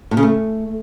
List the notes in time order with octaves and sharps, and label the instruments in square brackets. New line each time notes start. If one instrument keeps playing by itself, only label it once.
[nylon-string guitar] A2
C#3
A3